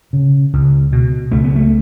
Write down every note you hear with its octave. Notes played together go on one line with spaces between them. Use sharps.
C#3
C#2
B2
C#2 A3
B3
A3